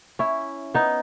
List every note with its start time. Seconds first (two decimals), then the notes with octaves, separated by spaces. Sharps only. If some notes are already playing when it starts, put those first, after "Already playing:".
0.19 C#4 E4
0.74 B3 D#4